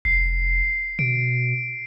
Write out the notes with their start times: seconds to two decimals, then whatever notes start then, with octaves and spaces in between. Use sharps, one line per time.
0.05 F1 C7
0.99 B2 D7